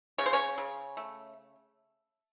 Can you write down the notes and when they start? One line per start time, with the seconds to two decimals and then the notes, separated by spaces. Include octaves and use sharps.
0.18 C#3 C#5
0.26 C5
0.33 C#4 C#5
0.58 C#3
0.97 A3